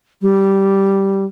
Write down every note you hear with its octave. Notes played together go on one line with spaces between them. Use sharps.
G3